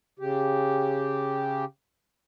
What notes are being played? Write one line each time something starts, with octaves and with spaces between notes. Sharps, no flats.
C#3 G4